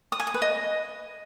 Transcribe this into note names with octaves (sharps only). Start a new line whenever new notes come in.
D#6
G#5
D#6
B4
D#5